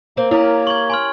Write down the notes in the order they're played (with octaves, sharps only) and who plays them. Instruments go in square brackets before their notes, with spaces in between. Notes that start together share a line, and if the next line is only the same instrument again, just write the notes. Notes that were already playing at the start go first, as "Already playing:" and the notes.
[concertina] A#3 [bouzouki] C4
[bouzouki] C#4 G4 A#4 [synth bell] E4
[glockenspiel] C#6 G#6 [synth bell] F#7
[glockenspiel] G#5 C6 F6